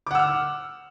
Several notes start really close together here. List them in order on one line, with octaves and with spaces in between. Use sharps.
D6 F#5 E6 F6